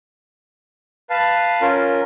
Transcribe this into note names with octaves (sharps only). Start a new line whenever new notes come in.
B4 F5 A5
C#4 F4 A#4